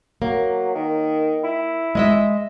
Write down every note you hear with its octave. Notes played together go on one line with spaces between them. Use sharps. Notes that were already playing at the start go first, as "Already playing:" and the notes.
F#3 A#3
D#3
E4
G#3 D#5 E5